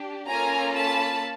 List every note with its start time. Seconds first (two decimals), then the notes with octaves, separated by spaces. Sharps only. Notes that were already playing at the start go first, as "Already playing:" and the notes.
Already playing: D4 G4
0.28 A#3 C#4 F4 A4 G#5 A#5
0.75 A5 B5